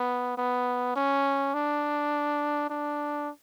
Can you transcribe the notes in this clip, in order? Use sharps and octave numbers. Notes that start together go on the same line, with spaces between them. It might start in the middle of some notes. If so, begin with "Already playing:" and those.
Already playing: B3
B3
C#4
D4
D4